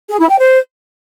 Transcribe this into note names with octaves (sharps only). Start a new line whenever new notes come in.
G#4
E4
G5
C5